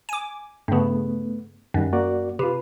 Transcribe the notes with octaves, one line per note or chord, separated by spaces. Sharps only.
G#5 D6
G2 C#3 A3 B3
F#2 D#3 G3
A#3 F#4 D5
C3 F4 B4